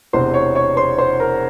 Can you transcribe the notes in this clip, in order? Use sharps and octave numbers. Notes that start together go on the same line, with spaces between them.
E1 E2 C3 C5 C6
C#5 C#6
C#5 C#6
C5 C6
C5 C6
A#4 A#5